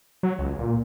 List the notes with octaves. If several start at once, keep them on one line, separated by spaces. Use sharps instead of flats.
F#3
C#2
A#2